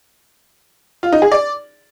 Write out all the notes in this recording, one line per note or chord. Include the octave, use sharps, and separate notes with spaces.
F4
D#4
G#4
D5